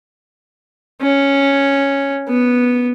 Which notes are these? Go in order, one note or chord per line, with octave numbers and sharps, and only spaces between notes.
C#4
B3